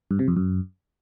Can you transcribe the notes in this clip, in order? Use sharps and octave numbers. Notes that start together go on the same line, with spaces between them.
G2
C3
F2
F#2